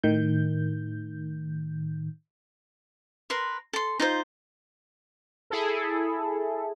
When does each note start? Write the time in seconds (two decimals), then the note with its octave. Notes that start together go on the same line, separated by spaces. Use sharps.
0.03 A2 D#3 G6
3.30 A#4 B4 C6
3.73 A4 C6
4.00 D#4 F4 C5
5.50 E4 G#4 A4